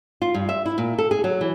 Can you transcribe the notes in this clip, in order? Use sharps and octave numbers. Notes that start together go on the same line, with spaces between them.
F4
G2
E5
E4
A#2
A4
G#4
F#3
E3